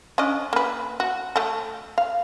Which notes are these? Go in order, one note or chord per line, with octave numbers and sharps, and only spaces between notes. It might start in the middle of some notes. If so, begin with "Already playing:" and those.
C#4 D4 D#5
A#3 B4
F#4
A3 A4
F5